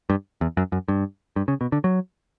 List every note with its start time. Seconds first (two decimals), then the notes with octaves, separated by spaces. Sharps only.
0.10 G2
0.41 E2
0.57 F#2
0.72 F#2
0.88 G2
1.36 G2
1.48 C#3
1.61 B2
1.72 D3
1.84 F#3